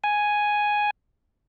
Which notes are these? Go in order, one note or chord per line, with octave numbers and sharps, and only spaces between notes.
G#5